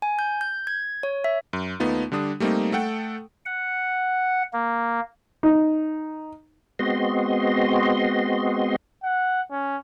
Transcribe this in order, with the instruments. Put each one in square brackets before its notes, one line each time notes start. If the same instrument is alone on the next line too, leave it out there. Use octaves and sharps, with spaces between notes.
[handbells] G#5
G6
G6
G#6
C#5
E5
[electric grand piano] F#2
D#2 A3 B3 D#4 F4
D3 G3 D4 D#6
G3 A3 A#3 C4 D#4
A3 A4 F#5 G5
[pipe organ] F#5
A#3
[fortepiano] D#4
[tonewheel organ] G#3 B3 C4 F#4 D#5 C6
[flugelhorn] F#5
C#4